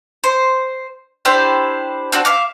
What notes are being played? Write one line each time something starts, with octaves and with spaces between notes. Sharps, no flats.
C5
D4 E4 G4 C5
C4 D4 F#4
E5 F5 D6